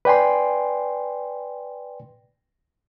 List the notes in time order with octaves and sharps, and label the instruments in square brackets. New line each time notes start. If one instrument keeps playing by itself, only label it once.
[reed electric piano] B4 D5 G5 G#5 C6